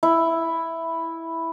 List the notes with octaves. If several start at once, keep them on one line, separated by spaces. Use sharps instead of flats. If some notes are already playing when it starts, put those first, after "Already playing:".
E4